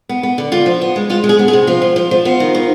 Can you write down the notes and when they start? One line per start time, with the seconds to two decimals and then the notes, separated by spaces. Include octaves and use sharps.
0.09 B3
0.23 B3
0.38 D3
0.52 D3 F4
0.66 F3
0.82 B3
0.96 G#3
1.10 G#3 F4
1.24 G#3
1.29 G#4
1.39 B3
1.48 G#4
1.53 C3
1.67 F3 F4
1.82 F3
1.96 F3
2.11 F3
2.25 B3 F4
2.40 D#3
2.55 D#3